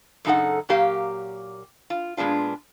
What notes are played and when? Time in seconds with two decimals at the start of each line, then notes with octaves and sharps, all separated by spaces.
0.25 F#2 C#3 D#4 G4 A4 F#5
0.69 A#2 F#3 A#3 G4 F5
1.90 F4
2.17 A#2 G#3 B3 D4 F4